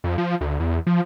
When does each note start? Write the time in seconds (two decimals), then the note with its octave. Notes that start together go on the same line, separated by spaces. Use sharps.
0.04 F2
0.18 F3
0.41 D2
0.60 E2
0.87 F3